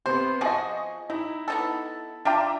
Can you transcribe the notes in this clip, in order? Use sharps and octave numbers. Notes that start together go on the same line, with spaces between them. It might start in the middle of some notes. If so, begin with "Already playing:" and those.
C3 B3 C5
F3 F#4 G#4 D#5 C#6
D#4 E4
B3 D#4 A4
D4 F4 E5 G5 A#5 D6